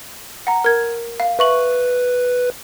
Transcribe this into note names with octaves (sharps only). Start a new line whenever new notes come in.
F#5 A#5
A#4 G#6
F5
B4 E5 C#6 F#7